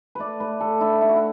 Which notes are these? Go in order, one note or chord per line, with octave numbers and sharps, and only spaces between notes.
A3 B4 D5
A2 B4
A2 A4
D4 E4
A3 E4
F#4
E4